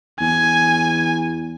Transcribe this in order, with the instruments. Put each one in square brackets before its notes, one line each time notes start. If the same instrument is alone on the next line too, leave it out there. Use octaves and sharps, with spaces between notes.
[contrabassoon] E2 [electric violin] G#5